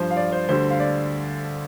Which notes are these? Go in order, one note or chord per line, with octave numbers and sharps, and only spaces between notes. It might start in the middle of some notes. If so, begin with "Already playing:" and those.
Already playing: G2 F3 C5
F5
D5
C5
D2 D3 G3 C5
F5
D5